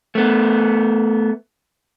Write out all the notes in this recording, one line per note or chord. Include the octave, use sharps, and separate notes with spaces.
A3 B3